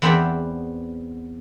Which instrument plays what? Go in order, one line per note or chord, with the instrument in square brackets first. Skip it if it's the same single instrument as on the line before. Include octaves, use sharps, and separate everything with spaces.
[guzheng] E2 B3 C4 C5 D5 E5